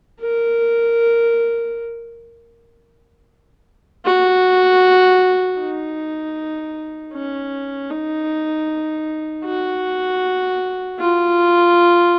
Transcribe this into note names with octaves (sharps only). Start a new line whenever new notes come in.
A#4
F#4
D#4
C#4
D#4
F#4
F4